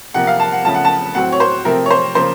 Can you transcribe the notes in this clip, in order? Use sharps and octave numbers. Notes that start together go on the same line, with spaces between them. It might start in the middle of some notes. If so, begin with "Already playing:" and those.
C3 F3 A#3 F#5
F5
A5
F#5
C#3 F3 A3 A5
F#5
A5
A2 F#3 C4 F#5
C#5
C5
C3 F3 A3 C4 A#4
C#5
C5
C#3 F3 A#3 C5